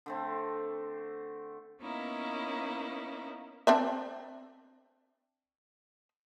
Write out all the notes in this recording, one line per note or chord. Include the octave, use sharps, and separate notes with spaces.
D3 A3 C4
A#3 B3 C#4 D#4 E4
C4 D4 E5